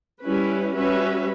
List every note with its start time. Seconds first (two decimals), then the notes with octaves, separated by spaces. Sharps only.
0.23 G3 C#4 E4 B4
0.75 G3 C#4 F#4 B4 E5